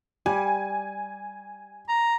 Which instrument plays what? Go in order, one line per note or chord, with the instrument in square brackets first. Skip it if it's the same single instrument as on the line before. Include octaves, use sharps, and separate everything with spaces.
[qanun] G3 [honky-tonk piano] G#5
[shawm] A#5